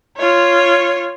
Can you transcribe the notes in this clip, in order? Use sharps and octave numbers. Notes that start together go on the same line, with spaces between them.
F4 C#5